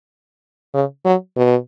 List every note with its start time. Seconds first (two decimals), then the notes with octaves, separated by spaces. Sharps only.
0.74 C#3
1.05 F#3
1.37 B2